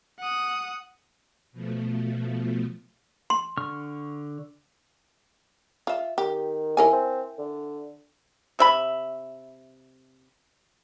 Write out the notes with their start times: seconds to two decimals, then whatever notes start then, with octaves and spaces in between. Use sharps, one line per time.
0.20 F#5 D#6
1.52 B2 F3 A3
3.30 C6
3.57 D3 C#6 F6
5.87 F4 E5
6.18 D#3 G4
6.77 D#2 E4 A#4 G#5
6.93 C4
7.38 D3
8.59 C3 E5 B5